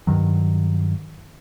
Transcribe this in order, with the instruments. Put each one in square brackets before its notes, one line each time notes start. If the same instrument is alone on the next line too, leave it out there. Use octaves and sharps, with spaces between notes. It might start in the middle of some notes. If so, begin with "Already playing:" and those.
[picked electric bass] G2 D#3 F#3